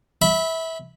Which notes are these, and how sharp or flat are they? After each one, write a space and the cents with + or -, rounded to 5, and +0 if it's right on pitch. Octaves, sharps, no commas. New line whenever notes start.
E5 -20 B5 +0